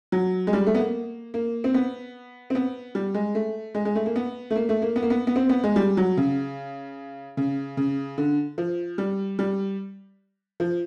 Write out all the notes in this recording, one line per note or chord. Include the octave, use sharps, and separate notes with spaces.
F#3
G#3
G3
A3
B3
A#3
A#3
C4
B3
C4
B3
G3
G#3
A3
G#3
G#3
A3
A#3
B3
A3
A#3
A3
A#3
B3
A#3
B3
B3
C4
B3
G#3
G3
F#3
C#3
C#3
C#3
D3
F3
G3
G3
F3